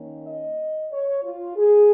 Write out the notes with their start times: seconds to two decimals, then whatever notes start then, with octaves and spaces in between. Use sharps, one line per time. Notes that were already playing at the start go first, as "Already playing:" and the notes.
Already playing: D#3 A#3 C#4
0.26 D#5
0.91 C#5
1.23 F4
1.56 G#4